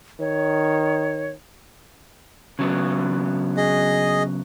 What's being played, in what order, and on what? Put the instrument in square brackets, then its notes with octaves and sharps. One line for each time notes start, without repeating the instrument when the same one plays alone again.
[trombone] D#3 [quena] C#5
[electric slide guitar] C#3 F#3 B3
[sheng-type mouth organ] G#4 D#5